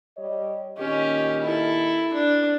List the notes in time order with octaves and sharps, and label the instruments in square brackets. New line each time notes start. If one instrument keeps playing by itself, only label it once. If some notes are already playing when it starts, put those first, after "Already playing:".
[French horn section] G3 C#5 D#5
[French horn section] A#2 D#3 D#5 [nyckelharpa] C#4 G4
[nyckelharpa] E4 A4
D4